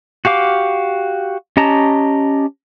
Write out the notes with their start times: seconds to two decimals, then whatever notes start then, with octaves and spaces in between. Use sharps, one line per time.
0.25 F#4 G4 F5 D6
1.57 C#4 G4 D#5 A5 A#5